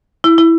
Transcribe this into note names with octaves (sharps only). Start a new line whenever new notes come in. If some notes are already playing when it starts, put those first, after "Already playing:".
E4
E4